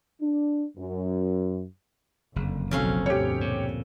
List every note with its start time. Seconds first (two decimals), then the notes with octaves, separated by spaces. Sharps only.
0.21 D4
0.78 F#2
2.36 F#1 F2 D3
2.71 B1 F2 D#3 F#3 C#4 F5
3.06 D2 G2 B2 G4 C#5
3.41 A#2